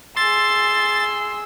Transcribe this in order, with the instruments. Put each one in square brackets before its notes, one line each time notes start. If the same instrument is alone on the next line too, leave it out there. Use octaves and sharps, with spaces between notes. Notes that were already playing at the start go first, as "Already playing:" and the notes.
[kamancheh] G#4 E6 [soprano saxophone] C6 [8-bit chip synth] A6